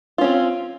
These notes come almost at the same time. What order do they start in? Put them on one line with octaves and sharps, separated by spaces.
F4 C#4 C4